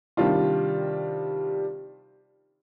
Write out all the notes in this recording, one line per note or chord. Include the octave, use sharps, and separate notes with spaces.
C3 D#3 G3 D4 F4